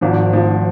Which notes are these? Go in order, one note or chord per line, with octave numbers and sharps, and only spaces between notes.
G#1 G#2 F3
G#1 G#2 F3